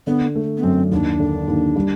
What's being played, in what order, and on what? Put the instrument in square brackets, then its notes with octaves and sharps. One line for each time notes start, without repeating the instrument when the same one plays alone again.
[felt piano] D3 [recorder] B3
[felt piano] A3
[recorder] B3
[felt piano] F#2 [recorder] C4
[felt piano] D#2 [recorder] D4
[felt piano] D3
D#2
G3